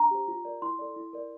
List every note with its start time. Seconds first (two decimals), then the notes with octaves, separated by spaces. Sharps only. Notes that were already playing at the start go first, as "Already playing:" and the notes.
Already playing: D4 A#5
0.11 G4 C5
0.28 F4
0.45 A#4 D5
0.62 E4 C6
0.79 A4 D5
0.96 E4
1.13 A#4 D5